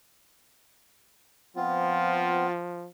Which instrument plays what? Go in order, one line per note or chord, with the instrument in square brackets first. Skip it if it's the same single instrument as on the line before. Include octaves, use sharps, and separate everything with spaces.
[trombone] F3 [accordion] B3 C4 [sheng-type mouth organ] F4